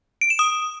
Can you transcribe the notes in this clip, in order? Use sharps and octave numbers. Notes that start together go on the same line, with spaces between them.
D7
E7
D#6